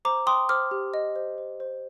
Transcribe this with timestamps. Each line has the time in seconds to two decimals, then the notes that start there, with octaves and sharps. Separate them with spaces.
0.05 C5 A#5 D6
0.27 G5 C6 D#6
0.49 C5 D6 F6
0.71 G4
0.94 D#5
1.16 C5
1.38 C5
1.60 C5